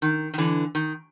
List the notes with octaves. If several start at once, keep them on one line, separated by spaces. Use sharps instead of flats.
D#3
D#3
D3 E3
D#3